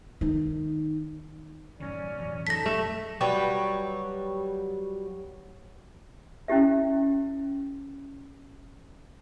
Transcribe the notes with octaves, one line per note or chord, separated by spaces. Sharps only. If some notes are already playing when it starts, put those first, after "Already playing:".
D#3 D#4
F#2 A2 D#3 C#4 D5
A1 E2 B2
F#2 B2 D#4 A4 A5 A#6 B6
A3
F#3 G3 B4 C#5
C#4 E4 G4 E5